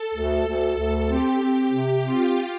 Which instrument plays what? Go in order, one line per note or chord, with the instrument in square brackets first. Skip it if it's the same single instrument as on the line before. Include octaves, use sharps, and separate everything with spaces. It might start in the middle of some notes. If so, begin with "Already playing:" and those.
Already playing: [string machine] A4
[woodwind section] D2
D2
D2
[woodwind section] C4 [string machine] G4
[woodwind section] C4
[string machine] G4
[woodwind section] C3
[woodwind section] C4 [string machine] F4